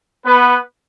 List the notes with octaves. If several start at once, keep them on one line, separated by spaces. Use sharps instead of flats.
B3 B4